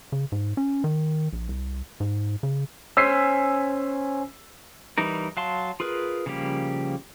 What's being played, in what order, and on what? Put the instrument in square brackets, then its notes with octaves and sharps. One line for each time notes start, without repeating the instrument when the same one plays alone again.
[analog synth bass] C#3
G#2
C#4
D#3
A#1
C2
G#2
C#3
[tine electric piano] C#4 C5 G#5 [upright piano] E6 B6 C7
[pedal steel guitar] E3 G3 D#4 A#4
F#3 F5 A5 C6
F4 G#4 A#4 B4
C#3 F3 G3 A#3 G4